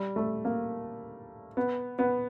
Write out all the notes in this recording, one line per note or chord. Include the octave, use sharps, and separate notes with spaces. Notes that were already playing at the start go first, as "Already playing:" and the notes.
Already playing: G3
A3
A#3
B3
B3